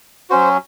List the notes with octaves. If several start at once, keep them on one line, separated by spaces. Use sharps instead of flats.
F#3 C#4 F#4 C5